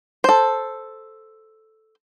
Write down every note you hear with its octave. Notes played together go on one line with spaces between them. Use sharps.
A4 C5